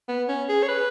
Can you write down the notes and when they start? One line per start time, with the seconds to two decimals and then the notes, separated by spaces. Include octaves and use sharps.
0.08 B3
0.28 C#4
0.49 G#4
0.63 C#5
0.68 B4